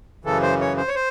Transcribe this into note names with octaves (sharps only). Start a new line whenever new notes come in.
F#2 C#3 E3 A4
C5
C#5
C5
C#5
C5